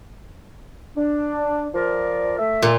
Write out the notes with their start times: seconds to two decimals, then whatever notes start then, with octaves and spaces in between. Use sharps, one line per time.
0.96 D4
1.74 F3 A#4 D5
2.39 A3 E5
2.62 A#2